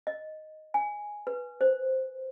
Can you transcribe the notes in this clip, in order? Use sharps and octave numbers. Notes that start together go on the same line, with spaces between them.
D#5
G#5
B4
C5